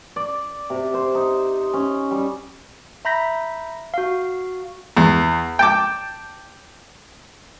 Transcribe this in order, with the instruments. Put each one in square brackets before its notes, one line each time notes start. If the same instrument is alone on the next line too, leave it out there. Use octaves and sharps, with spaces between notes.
[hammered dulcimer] D5
C3
C5
D#4
C#4
G3
[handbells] E5 A#5 B5 G6 A#6 B6
F#4 F5
[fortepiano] E2
G5 A5 D6